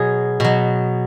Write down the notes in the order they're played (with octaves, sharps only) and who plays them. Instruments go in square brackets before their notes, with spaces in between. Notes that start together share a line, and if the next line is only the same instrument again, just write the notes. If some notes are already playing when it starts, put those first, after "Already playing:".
Already playing: [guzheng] B2 F#3 G#4
B2 F#3